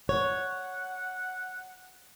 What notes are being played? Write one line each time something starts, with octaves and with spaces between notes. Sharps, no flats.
C#5 F#5